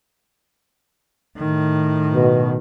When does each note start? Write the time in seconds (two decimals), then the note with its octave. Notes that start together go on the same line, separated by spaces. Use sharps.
1.37 A2 D#3
2.13 B2